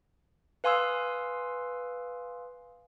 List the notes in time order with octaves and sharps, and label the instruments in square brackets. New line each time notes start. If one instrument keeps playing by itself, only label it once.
[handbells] B4 F5 G#5 C6 D#6 E6